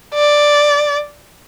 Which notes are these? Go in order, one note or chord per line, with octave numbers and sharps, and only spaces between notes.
D5